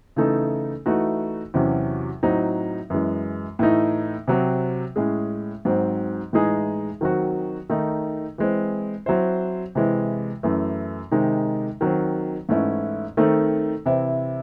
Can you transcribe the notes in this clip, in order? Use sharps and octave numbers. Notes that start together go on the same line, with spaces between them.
C#3 E3 A3 D#4 A4
E3 A3 D#4 F#4
E2 C3 F#3 C#4 F#4
A2 F#3 C4 D#4
F#2 E3 G#3
A2 E3 A3 D#4
C3 F#3 C4
A2 G#3 C#4 G#4
G#2 F#3 C4
A2 E3 G#3 D#4 G#4
D#3 F#3 C4 F#4
D#3 A3 D#4
E3 G#3 C4
F#3 C4 E4 C5
C3 E3 G#3
F#2 E3 A3
C3 D#3 G#3 D#4
D#3 F#3 C4
G#2 E3 A3 C#4 E4
D#3 A3 C4 D#4 A4
C3 E3 C4 E4